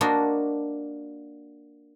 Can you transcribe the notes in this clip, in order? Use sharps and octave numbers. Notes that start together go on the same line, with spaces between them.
A#3 D4 F#4 C5 D#5